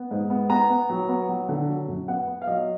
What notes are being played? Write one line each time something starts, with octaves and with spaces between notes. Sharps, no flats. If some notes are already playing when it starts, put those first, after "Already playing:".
Already playing: B3
G#2
B3
B3 A#5
B3
F#3
B3
F#3
D3
F#3
F#2
B3 F#5
B3
F5
F#3 D#5